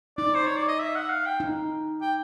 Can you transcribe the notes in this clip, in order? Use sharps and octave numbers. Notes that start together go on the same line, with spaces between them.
D#4 D5
C5
C#5
D5
D#5
E5
F#5
F5
G5
D#4
G5